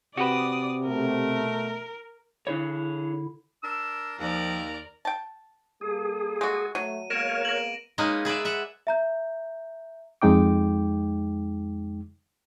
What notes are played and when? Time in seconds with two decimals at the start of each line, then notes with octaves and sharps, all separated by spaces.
0.17 C3 F#4 G4 B4 D5 D#6
0.87 B2 A3 A#4
2.47 D3 D4 E4 G#4 C#5
3.63 D4 A#4 E6
4.19 D#2 F3 A#4 D5
5.05 G5 A5
5.81 G3 A#3 G#4 A4
6.41 G#3 F#4
6.75 F#3 A3 D#7
7.10 G#3 A#3 B3 A#4 C#5 A#6 D7 E7
7.45 A#6 F#7
7.98 G#3 A#3 C#4 D#4 B4
8.25 G#4 B4 D5 E5
8.45 B4 E5 F#5
8.87 E5 A#5 G6
10.22 F2 G#3 D#4 G5 D6